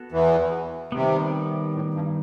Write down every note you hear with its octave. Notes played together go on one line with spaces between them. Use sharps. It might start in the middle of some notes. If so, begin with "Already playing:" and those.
Already playing: B3 F#4 A4
E2 E3
C3 D#3 G3 B3
A2
G2